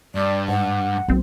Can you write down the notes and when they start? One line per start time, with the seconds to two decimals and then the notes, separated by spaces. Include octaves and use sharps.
0.15 G2 D5
0.48 G#2 F#5
1.08 B1 F#3 A#3 C4